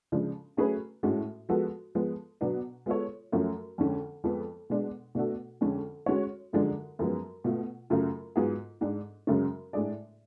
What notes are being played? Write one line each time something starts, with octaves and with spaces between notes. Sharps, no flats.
C#3 F3 G#3 D4
F#3 A3 C#4 G#4 B4
A2 G#3 C#4 F#4
F3 G#3 B3 F#4 A4
F3 G#3 B3
B2 F#3 B3 D4
G#3 B3 F4 A4 C#5
F#2 F3 A3 C#4 F#4
F2 D3 G#3 C#4
F2 F3 G#3 B3
B2 G#3 D4
B2 A3 D4 F#4 A4
F2 D3 G#3 C#4
G#3 C#4 F#4 C#5
F#2 D3 F3 G#3 D4
F#2 F3 G#3 B3
B2 A3 F4
F#2 C#3 F#3 A3 F4
G#2 F#3 B3 F4 G#4
G#2 G#3 D4
F#2 C#3 G#3 C#4
A2 G#3 D4 G#4 D5